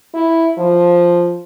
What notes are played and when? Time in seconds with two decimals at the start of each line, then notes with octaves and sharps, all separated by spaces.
0.14 E4
0.58 F3